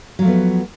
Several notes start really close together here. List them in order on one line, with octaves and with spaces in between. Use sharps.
F#3 F3 A3 B3